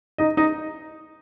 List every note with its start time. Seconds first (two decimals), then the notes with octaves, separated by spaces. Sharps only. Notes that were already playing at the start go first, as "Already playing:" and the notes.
0.18 D#4 D#5
0.37 D#4 D#5